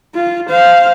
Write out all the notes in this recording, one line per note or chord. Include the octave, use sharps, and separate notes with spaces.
F4
C5 F5